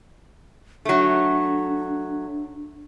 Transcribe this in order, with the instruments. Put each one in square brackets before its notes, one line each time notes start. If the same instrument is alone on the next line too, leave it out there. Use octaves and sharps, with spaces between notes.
[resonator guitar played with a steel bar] F#3 A3 [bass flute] D4